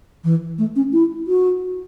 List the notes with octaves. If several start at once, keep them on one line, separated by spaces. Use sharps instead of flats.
E3
A3
C#4
E4
F#4